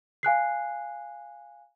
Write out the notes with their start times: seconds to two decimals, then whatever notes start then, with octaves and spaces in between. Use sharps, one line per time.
0.23 F5 G#5 F#6 C7